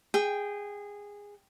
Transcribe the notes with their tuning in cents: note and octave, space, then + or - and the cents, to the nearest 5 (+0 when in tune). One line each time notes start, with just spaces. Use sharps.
G#4 -15 G5 +0